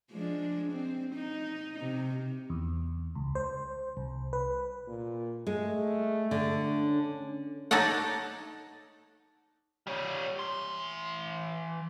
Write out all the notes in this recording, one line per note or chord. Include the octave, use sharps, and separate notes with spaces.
F3 G#3 D4
C4
D#4
C3
E2
C#2
C5
C2
B4
A#2
G#3 A3
D3
C#4
D#4 A4 C#5 D5 F#5
G3 C#5
E3 C6